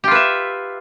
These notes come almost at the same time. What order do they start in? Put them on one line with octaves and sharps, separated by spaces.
G4 F4 B4 E5